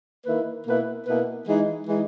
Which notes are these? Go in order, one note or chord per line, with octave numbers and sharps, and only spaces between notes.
D#3 A#3 E4 B4
B2 A#3 E4 B4
B2 A#3 E4 B4
E3 G#3 D#4
E3 G#3 D#4